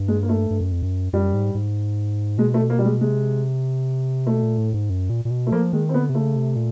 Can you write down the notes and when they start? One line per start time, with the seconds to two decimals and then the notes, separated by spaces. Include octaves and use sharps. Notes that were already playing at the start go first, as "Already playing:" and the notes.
Already playing: G2
0.08 G#3
0.23 A#3
0.29 A3
0.50 G2
0.61 F#2
0.72 F2
0.82 F#2
1.13 F#2 G3
1.33 G#2
1.55 G#2
2.38 B2 G#3
2.54 A3
2.70 A#3
2.79 G3
2.85 G#3
3.01 C3 G#3
4.27 B2 A3
4.43 A#2
4.58 A2
4.73 G#2
4.90 F#2
5.10 A#2
5.25 A#2
5.31 B2
5.47 A3
5.52 F3 A#3
5.72 D#3 G#3
5.89 C4
5.94 D3 B3
6.09 C3
6.14 C#3 A3
6.36 C3
6.56 A#2